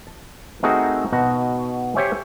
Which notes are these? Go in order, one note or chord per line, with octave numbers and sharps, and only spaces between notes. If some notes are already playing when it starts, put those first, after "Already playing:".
A5
A3 C4 D#4 F#4 G#4 A#4
B2 D#4 F#4
G4 C5 C#5 E5 G#5